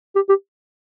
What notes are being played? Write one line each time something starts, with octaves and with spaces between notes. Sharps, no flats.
G4
G4